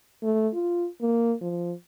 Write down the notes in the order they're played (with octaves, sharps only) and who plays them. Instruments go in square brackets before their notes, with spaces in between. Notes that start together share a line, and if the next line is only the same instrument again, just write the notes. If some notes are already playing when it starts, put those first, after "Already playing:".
[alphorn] A3
F4
A#3
F3